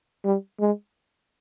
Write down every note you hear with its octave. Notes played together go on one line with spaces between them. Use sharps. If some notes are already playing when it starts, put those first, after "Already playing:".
G3
G#3